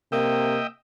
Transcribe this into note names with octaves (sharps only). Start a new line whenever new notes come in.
C3 A#3 D#5 E5 G5